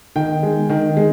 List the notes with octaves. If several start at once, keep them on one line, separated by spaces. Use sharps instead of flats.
D#3 G5
G#3
D#3
G#3